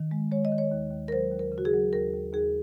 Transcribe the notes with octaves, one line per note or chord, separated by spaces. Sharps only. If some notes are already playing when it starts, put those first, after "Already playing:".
Already playing: D#3
G#3
G#3 C#5
D#5
D#3
C#5
D#2
D#2
A#4
F#3 C5
D#2
A#4
C#3
F#4
G#4
F#3
D#2 A#4
D#2
D#2 G#4